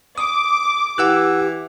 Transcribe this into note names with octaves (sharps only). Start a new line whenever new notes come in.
D6 D#6
E3 G4 F#5 E6 F#6